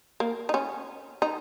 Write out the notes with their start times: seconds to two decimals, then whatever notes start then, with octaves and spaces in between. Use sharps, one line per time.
0.20 A#3
0.49 D#4
0.54 C#4
1.22 D#4